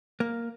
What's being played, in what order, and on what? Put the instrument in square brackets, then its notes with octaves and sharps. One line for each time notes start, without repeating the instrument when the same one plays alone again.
[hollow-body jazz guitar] A#3